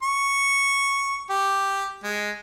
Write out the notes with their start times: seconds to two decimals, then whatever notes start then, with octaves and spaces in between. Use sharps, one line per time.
0.03 C#6
1.30 G4
2.04 G#3